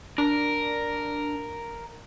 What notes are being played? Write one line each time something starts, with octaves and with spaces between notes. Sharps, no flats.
D4 A#4